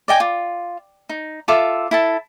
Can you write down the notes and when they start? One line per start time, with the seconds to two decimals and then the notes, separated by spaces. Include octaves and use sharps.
0.08 D5 D#5 G5 G#5
0.20 F4
1.09 D#4
1.48 F4 A4 E5 D6
1.91 E4 A4 A5